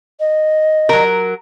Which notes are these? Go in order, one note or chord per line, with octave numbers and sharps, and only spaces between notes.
D#5
F#3 A#4